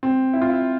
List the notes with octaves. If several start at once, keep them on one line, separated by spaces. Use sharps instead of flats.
C4
E4
F4
E4